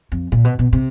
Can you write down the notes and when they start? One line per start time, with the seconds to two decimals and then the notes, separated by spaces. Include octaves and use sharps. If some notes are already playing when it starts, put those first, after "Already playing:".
0.12 F2
0.32 A#2
0.44 B2
0.59 B2
0.73 C3